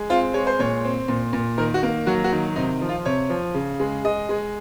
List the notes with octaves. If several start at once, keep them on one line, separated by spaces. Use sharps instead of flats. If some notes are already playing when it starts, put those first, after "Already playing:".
Already playing: G#3
C4 F4
G#3 C#5
C5
A#2 C#5
C4
A#2
A#2
D#3 A#4
F#4
A#3
F#3 F#4
F#4
D#3
C3 D#4
F3
F4
C3 C#5
F3
C#3
G#3
G#3 D#5
G#3